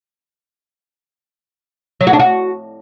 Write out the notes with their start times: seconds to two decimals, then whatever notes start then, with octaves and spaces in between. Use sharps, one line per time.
2.01 F#3
2.07 F#4
2.13 D4
2.19 F#4